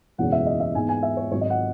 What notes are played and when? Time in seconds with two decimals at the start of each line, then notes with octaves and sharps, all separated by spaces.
0.18 F#1 E2 B2 G#3 C#4 F#5
0.32 E5
0.46 D#5
0.60 E5
0.75 G#2 E3 G#3 B3 G#5
0.89 G#5
1.03 E5
1.17 C#5
1.31 G#1 G#2 F#3 C#5
1.41 D#5
1.50 F#5